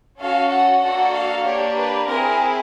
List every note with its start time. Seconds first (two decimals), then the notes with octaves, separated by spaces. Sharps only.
0.19 C#4 F#4 A4 F5
0.50 F#5
0.81 A#3 D4 F#4 A4 F#5
1.13 F5
1.45 A#3 D4 G4 C#5
1.76 B4
2.07 C4 E4 G#4 A#4